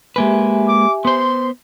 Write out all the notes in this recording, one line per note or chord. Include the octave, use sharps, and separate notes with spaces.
G#3 A#3 G4 B4 E5 G#5
D6
B3 C5 C6